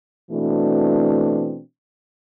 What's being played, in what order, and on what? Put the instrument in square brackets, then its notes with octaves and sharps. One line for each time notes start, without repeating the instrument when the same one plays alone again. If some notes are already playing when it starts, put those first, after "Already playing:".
[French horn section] B2 E3 A3 C4 D4 F#4